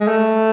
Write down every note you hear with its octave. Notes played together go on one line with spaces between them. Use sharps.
G#3
A3